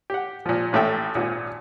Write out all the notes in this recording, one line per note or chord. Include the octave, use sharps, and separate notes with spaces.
G4 F#5
A#2 F3
A1 A2 A3 E5 G5
G#1 A#2